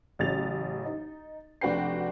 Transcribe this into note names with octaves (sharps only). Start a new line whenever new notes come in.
A1 C#3 F#3 A6 F7
D#4
F1 D4 F#4 B4 G5 C7